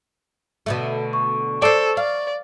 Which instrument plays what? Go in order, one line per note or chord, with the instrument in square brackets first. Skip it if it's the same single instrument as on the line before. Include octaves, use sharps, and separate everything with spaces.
[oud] B2 D3 A3
[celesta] C#6
[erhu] A4 [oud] C5 D5
[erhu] D5 [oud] F5